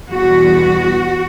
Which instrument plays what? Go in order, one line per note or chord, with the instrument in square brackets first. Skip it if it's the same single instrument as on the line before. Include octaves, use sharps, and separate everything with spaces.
[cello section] E2 B2 G3 B3 F#4